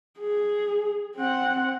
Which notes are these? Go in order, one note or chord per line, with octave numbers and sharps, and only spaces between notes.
G#4
C4 F#5